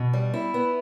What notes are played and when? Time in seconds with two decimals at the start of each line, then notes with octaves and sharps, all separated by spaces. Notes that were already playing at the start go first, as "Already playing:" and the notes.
Already playing: B2
0.13 G3
0.34 E4
0.54 B3